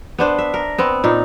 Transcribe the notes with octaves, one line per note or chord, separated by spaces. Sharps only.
B3 D4 C5
E5
A#4
B3 C4
A#2 D#4